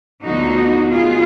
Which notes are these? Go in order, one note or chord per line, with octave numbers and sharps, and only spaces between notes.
D2 D3 F3 B3 D#4 F#4
B2 F#3 B3 F4 G#4